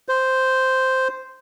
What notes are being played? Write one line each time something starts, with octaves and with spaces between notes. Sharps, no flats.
C5